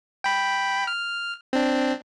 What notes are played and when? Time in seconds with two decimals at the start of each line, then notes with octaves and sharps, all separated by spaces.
0.24 G5 B5
0.87 F6
1.53 C4 D4